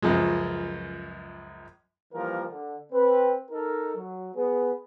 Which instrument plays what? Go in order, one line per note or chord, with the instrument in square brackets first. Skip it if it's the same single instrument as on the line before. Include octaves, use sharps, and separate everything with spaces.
[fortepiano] C#2 F#2 F3 G#3
[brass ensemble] E3 F3 G3 A#3 A#4
D3
C4 B4
D#4 A4 A#4
F#3
B3 G#4 B4